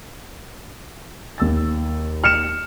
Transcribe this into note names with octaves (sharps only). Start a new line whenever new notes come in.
D#2 E6 A6
F6 C#7 E7